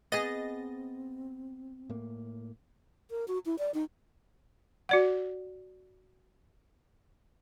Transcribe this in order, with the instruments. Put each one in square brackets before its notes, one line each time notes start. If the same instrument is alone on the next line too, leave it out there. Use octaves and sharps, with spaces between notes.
[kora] B3 G#4 [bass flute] C4 [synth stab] D#5 A6 A#6
[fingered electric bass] A2 A#3
[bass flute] A#4
F#4
E4
D5
D#4
[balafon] F#4 D5 F#5